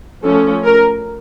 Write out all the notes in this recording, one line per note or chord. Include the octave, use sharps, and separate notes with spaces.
F3 A3 C#4 A4
A#4